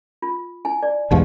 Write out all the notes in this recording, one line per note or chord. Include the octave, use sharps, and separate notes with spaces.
F4
E4 G#5
D5
B1 E2 G#2 D#4 G4 F5